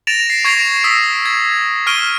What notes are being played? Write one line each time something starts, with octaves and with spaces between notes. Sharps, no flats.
A6 A#6 D7 E7 F7
C7
C#6 G#6 A#6 C7 D7 F7
D#6 E6 A#6 B6
G#6
C#6 F6 D7 D#7 G7